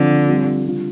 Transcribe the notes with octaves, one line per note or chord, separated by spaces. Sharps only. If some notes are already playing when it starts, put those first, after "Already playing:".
Already playing: D3 F3 C4 F4
G3 C4 F4
G3 D4 F4